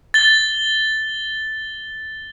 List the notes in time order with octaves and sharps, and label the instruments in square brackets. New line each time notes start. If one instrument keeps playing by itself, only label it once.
[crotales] A6 G7